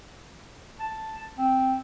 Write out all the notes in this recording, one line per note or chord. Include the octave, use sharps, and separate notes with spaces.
A5
C4